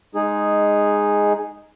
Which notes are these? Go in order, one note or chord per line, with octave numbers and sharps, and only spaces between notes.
G#3 D#4 G#4